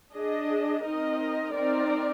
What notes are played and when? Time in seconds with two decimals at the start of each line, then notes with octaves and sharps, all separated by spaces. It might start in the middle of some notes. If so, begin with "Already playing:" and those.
0.14 D4 G#4 D#5
0.85 C4 D#4 A#4 D#5
1.55 C4 D#4 A#4 D5